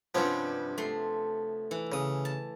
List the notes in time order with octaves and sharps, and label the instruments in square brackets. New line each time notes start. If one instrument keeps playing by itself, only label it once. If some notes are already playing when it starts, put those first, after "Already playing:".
[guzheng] G2 C3 [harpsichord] F3 B3 C#4
[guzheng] A3 C6
E3
[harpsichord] C#3 D#6
[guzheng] A5